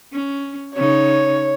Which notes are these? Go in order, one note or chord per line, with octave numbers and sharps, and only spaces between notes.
C#4
C#3 D#4 C#5